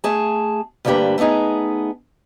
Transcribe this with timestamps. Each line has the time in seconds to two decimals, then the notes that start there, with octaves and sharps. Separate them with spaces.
0.04 A3 G#4 A5
0.85 D2 G2 A#3 D4 G4 B4
1.18 A3 B3 D4 D#4 G#4